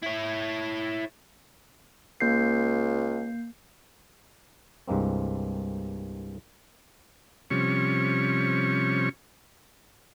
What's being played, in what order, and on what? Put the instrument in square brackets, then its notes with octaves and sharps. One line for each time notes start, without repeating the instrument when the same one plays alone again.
[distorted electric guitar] E4 C#5
[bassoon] C#2 [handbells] A#3 G6 C7
[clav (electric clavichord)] C2 G2 G#3 A#3 C4
[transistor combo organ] C3 F3 G3 C#4 C#6